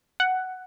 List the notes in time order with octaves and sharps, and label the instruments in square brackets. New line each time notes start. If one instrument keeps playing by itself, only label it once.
[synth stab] F#5